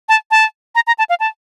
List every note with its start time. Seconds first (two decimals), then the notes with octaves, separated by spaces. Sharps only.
0.09 A5
0.31 A5
0.75 A#5
0.87 A#5
0.98 A5
1.09 F5
1.20 A5